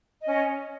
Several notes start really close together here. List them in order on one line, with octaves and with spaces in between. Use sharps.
D#5 C#4 C#5